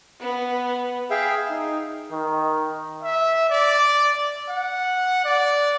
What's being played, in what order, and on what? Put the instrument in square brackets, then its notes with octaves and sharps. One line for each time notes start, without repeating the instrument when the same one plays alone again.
[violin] B3
[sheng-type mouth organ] G#4 E5 F5 G5
D#4
[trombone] D#3
[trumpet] E5
D5
F#5
D5